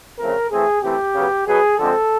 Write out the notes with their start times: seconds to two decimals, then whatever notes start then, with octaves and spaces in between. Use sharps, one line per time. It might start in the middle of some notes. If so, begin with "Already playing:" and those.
0.19 C#3 F3 A3 C4 A#4
0.51 E3 A3 C4 G#4
0.83 C3 E3 A3 C4 G4
1.16 C#3 F#3 B3
1.47 B2 F#3 B3 G#4
1.79 D3 F3 G#3 C4 A4